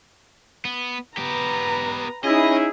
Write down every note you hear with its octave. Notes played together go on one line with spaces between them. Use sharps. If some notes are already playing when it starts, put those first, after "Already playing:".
B3
B3 G4 B4 A#5
C#4 D#4 E4 G#4 D#5